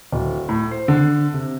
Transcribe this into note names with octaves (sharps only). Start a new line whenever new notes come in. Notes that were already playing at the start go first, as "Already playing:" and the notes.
D1
A2
C5
D3
C3